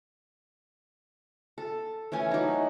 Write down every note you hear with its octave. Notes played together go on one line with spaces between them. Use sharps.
A4
E3 A3 C#4 G#5
F#3 D#4